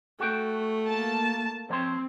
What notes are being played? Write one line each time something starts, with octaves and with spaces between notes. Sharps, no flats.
A3 F#4 G5
A#3 A5
F3 C4 C#5 C6